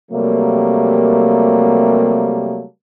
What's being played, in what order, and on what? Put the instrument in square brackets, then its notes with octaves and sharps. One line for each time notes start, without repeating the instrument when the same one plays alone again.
[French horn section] C3 F#3 G3 A3 A#3